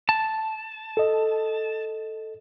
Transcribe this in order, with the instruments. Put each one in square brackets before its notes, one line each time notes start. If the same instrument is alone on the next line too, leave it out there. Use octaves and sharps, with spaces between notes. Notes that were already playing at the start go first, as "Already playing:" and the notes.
[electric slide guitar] A5
[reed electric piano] A4 D#5